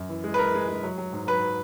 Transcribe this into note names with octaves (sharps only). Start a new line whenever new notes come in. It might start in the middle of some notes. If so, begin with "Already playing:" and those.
Already playing: F#2
E3
G#3
B4
G#3 A#4
G#3
G#3
F#3
F#3
G#2
F#3 B4